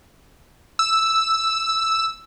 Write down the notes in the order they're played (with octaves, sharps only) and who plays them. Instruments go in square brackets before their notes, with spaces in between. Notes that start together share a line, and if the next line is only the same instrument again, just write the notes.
[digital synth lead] E6